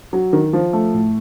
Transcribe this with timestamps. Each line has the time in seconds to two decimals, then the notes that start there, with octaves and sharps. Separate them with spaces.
0.13 F#3
0.33 D#3
0.53 F3
0.73 A3
0.93 A2